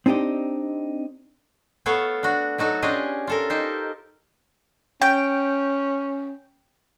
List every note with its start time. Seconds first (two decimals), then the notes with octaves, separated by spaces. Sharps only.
0.06 C4 D4 D#4 G4 D#5
1.86 A3 B3 A4 C#5 F5
2.23 D4 F#4
2.58 F#3 D#4 F#4 A4
2.82 C#4 D4 F4 G4 G#4 D#5
3.27 F4 A4 A#4
3.50 D#4 G4 C5
5.02 C#4 G5